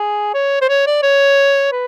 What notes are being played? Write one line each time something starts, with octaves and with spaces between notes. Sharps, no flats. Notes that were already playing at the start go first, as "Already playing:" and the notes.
Already playing: G#4
C#5
C5
C#5
D5
C#5
B4